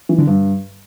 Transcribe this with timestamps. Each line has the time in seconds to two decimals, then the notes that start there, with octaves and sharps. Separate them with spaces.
0.09 E3
0.18 D3
0.27 G2